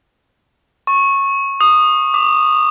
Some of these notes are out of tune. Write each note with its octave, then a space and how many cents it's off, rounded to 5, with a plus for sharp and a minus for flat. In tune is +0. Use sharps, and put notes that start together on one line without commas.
C#6 -15
D#6 -15
D6 +15